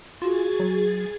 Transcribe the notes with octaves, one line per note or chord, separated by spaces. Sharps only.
F4 F#4 G#4 G#6 A6
F#3